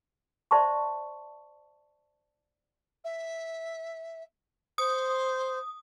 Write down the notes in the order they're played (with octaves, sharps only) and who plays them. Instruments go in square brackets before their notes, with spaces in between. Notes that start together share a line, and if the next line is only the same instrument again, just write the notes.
[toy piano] C5 D5 E5 A5 C6 C#6
[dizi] E5
[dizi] C5 [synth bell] D#6